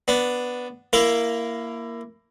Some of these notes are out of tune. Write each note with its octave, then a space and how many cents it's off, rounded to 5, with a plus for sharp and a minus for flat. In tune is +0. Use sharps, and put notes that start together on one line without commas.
B3 +0 D4 +0
A#3 +0 E4 +20 A#4 +0